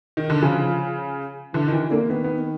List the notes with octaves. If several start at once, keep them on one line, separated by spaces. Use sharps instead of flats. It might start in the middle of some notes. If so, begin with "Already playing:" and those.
D#3
D3
C#3 F3
D3 E3
D#3
E3
D3 A#3
D#3 B3
B3